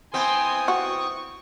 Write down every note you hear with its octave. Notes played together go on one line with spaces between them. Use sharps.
B3 C4 E4 G5 G#5 C6 D#6
F#4 C#6